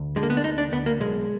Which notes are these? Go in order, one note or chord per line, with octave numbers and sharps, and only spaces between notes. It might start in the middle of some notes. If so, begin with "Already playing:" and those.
Already playing: D2
D3 G#3
A#3
B3
D4
D2 D#4
D4
D2 B3
A#3
B1 G#3